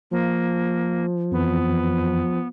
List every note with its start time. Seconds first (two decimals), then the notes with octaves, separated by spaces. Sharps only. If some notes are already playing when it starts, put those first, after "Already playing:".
0.11 F3 A#3
1.32 F2 E3 B3